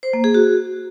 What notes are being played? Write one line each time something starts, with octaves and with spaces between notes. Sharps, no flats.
C5
A#3
G#4
F#4